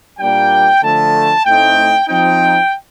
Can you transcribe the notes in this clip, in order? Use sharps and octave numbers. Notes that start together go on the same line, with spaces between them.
A#2 G3 A#3 D4 G5
D3 F3 A3 A5
A2 A3 C4 D#4 G5
F3 C4 D#4 G5